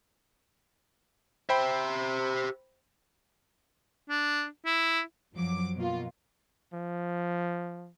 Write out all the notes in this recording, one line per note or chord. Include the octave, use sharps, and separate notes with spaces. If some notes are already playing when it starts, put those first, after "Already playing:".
G4 C5 E5 G5 B5
D4
E4
F#2 F3 F#3 D6
B2 A#3 F4
F3